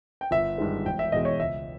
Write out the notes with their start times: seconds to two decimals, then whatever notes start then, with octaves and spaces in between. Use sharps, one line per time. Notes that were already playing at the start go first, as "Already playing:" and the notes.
0.21 G5
0.31 G1 E5
0.58 G2 D#3 G#3
0.86 E1 G5
0.99 E5
1.12 E2 B2 G#3 D#5
1.25 C#5
1.40 C#2 E5